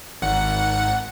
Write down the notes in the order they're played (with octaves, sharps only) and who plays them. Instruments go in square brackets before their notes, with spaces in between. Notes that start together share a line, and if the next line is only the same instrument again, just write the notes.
[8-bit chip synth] G#1 F#5